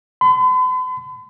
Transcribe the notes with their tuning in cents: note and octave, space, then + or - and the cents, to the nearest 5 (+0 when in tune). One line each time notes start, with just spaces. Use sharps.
B5 +45